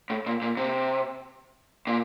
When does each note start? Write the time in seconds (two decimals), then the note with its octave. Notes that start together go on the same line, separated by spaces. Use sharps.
0.10 A2
0.26 A#2
0.42 A#2
0.57 C3
1.87 A#2